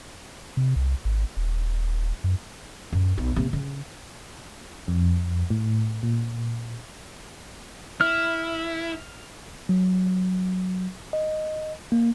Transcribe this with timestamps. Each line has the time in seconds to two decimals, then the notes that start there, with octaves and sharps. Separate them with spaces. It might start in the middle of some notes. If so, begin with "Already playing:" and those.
0.57 C3
0.76 C2
1.05 G#1
1.37 D#1
2.24 F#2
2.93 F#2
3.17 B1 D#4
3.36 C3 A#3
3.53 C#3
4.88 F2
5.50 A2
6.03 A#2
8.01 E4 F6
9.69 F#3
11.13 D#5
11.92 A#3